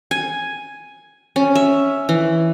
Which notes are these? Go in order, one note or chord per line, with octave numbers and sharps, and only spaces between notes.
G#5
C#4
E5
E3